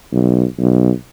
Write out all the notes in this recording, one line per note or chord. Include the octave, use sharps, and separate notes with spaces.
B1
B1